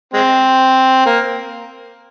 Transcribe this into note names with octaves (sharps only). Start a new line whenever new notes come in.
G#3 C4
A#3